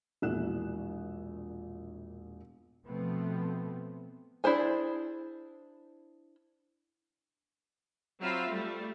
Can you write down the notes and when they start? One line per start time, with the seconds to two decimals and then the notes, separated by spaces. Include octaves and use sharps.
0.22 E1 A#1 A#2 E4 F#6 E7
2.86 B2 F3 A3 B3 C4
4.44 D4 E4 G#4 C5 G#5
8.20 F#3 C4 F4 E5 F5 B5
8.49 G3 A3